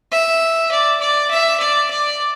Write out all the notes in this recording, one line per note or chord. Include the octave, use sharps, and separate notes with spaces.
E5
D5
D5
E5
D5
D5